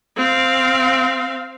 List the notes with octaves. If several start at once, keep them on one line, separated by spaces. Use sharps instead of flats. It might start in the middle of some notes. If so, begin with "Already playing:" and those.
C4 F5